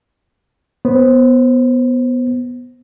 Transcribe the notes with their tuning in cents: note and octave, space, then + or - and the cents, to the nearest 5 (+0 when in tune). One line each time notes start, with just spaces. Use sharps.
B3 +0 C5 +15